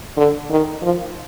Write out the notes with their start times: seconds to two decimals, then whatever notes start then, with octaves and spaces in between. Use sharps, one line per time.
0.17 D3
0.50 D#3
0.82 F3